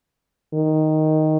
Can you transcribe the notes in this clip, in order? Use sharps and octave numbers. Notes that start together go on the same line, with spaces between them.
D#3